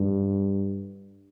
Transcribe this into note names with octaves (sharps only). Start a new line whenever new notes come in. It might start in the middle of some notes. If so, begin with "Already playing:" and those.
Already playing: G2